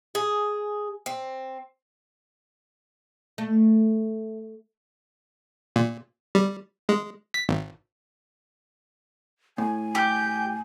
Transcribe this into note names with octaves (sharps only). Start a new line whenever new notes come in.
G#4
C4
A3
A#2
G3
G#3
B6
G#1
A2 G#5
G4 G6